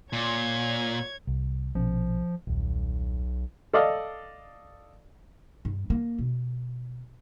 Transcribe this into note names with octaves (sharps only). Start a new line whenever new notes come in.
A#2 C#5 G#6
C2
A#1 B2 F3 C#4
D#1 B1
A4 D5 D#5 F5
G2
A#3
B2